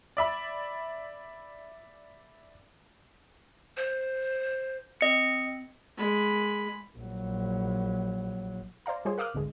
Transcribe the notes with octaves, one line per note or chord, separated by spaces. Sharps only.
D5 E5 B5
C5
C4 D#5 C#7
G#3 B5
A#1 F#3
C5 D5 F5 A#5
G3 F4 G#4 C5 C#5
A#4 F5 D6 D#6 F6 F#6
G#1 D2 D3 G#3